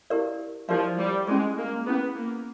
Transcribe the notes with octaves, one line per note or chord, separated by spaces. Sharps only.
E4 G4 A#4 D5 F5
F3 E4 G4 A#4 D5 F5
G3
G#3 C#4 E4 G#4
A#3
B3 C#4 E4 G#4
A#3